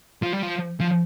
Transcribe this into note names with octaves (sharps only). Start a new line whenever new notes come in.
F3
G3
F3
F3